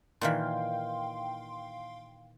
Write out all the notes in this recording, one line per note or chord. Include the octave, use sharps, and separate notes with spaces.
A#2 D#3 E3 F5 G5 C6